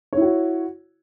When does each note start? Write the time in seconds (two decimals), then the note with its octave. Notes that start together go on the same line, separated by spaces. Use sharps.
0.13 C#5
0.17 E4
0.22 F#4